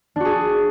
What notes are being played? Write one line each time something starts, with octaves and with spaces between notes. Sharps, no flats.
D4 F#4 G#4